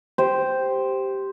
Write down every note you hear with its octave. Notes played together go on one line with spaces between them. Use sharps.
G4 C5